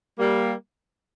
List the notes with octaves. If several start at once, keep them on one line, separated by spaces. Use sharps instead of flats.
G3 A#3